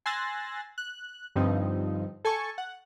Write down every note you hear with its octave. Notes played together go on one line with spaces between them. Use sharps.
G#5 C6 E6 F#6 A6 A#6
F#6
G2 D3 F3 C4 D#4
A4 G#5 A5 C#6
F#5